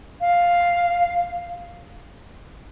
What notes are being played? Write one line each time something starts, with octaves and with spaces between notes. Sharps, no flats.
F5